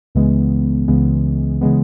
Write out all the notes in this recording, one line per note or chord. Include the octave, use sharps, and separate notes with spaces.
C#2 C#3 E3 G#3 B3
C#2 C#3 E3 G#3 B3
C#3 E3 G#3 B3